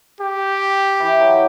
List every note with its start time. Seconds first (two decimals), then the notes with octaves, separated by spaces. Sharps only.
0.21 G4
1.00 E3
1.20 F#3